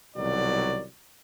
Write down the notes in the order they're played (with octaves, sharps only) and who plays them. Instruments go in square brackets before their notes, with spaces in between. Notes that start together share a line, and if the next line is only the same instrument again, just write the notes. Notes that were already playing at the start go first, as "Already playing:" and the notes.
[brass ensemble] C2 B2 D#3 F#3 D5